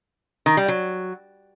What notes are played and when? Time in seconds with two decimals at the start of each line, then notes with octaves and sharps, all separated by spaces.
0.46 D#3
0.57 G3
0.68 F#3